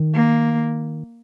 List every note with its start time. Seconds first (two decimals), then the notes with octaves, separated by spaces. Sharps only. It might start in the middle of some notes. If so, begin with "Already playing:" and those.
Already playing: D#3
0.15 A#3